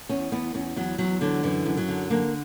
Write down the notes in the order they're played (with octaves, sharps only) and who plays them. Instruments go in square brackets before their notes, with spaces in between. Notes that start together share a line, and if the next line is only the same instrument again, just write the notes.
[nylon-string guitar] E2 C#4
E2 B3
E2 C#4
E2 F#3
E2 F#3
D3 F#3
F#2 E3
F#2
F#3
D3
D3 A#3